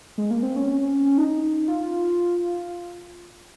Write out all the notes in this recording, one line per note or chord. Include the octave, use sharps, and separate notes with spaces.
G#3
A#3
C4
C#4
D#4
F4